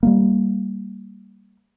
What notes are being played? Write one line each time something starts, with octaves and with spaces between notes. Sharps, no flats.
G3 A3 A#3